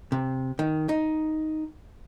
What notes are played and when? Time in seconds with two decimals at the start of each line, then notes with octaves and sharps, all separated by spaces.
0.12 C3
0.59 D#3
0.89 D#4